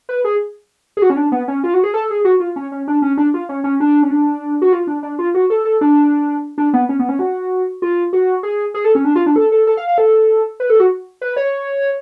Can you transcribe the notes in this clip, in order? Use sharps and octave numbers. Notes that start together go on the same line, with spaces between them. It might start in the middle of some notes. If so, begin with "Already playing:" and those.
B4
G#4
G#4
F#4
C#4
D4
B3
C#4
F4
F#4
G#4
A4
G#4
F#4
F4
C#4
C#4
D4
C#4
D4
F4
C#4
C#4
D4
C#4
D4
F#4
F4
D4
D4
F4
F#4
A4
A4
D4
D4
B3
C#4
B3
C#4
F#4
F4
F#4
G#4
G#4
A4
C#4
D4
F4
D4
A4
A4
A4
F5
F5
A4
B4
A4
F#4
B4
C#5